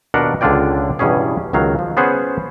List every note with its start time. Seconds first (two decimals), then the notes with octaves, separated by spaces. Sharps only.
0.14 D#2 B2 D4 A#4 F#5
0.41 C#2 D3 D4 F4 D5 G5
0.99 E2 G2 B2 C#4 G#4
1.53 C#2 D#3 F#3 F5
1.79 F3
1.97 B3 C#4 G#4 C5 F#5